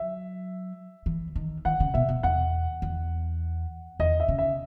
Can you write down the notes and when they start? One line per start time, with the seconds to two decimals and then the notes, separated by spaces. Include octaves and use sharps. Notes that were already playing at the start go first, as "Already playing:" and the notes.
Already playing: F#3 E5
1.06 E3
1.36 D#3
1.65 D#3 F#5
1.80 C#3
1.94 B2 E5
2.09 B2
2.23 E2 F#5
2.82 E2
4.00 E2 D#5
4.20 E5
4.28 C#3
4.38 E5